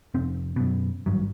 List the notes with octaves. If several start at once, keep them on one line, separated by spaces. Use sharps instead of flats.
F1 C4
F#2 B2
G#1 G2 F#3